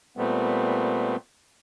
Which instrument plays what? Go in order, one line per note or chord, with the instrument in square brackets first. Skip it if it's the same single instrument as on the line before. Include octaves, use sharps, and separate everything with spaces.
[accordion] A#2 G3 A3 B3 C4